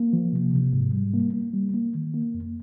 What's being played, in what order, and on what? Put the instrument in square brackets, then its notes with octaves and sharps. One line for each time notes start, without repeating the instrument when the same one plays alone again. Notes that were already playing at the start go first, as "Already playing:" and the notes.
Already playing: [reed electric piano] A#3
F3
C3
C3
G#2
G3
A#3
A#3
G3
A#3
D#3
A#3
F2